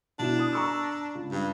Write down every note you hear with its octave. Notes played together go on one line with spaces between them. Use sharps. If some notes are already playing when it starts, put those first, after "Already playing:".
B2 D4 E4 E7
D#6
A#5 C#6 E6
C#2
G2